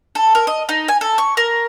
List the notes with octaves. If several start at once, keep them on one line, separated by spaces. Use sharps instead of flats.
A4
A#4
D#5
D#4
G#5
A4
C#6
A#4